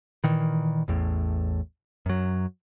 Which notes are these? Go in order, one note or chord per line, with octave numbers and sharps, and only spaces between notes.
A#2 D#3 E3
A1 E2 A2
F#2 F#3